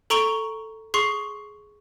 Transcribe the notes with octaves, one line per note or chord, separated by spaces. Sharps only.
A4 A#5 C#6 D7 F7 G7
G#4 C6 C#6 C7